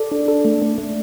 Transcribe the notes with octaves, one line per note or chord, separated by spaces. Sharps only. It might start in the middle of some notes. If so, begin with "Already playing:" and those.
Already playing: A4 D5
D4
A4
A3
A3
A3